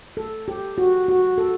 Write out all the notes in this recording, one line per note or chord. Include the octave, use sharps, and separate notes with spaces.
A4
G4
F#4
F#4
A4